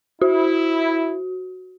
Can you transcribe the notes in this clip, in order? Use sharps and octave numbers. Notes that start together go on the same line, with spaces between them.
E4 F#4